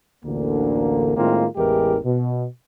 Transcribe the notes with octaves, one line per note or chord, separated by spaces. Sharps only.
A1 D2 D3 A#3
A2 D#3 G#3 A#3 C4 F4
A1 E2 E3 G#3 G4 A#4
B2